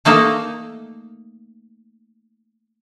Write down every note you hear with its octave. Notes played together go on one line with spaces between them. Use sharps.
A3 A#3 D#4 A4